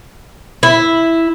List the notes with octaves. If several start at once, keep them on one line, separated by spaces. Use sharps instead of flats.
E4